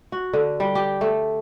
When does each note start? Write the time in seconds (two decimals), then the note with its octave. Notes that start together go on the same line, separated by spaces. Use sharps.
0.12 F#4
0.33 D3
0.60 G3
0.75 G4
1.01 A3